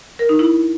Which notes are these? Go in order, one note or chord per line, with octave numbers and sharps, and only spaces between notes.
A#4
D#4
E4